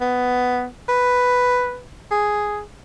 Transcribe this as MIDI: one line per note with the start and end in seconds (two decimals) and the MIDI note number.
0.01 0.67 59
0.89 1.82 71
2.11 2.60 68